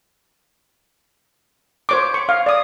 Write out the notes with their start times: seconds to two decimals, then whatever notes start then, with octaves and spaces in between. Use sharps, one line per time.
1.89 C5 C#5 D6
2.14 C#6
2.29 F5
2.46 D5 D#6